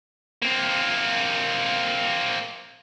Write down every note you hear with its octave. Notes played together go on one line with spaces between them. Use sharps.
A#3 C4